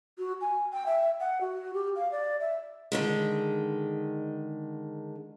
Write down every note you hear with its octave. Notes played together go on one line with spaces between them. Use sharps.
F#4
G#5
G5
E5
F#5
F#4
G4
F5
D5
E5
D3 D#3 G#3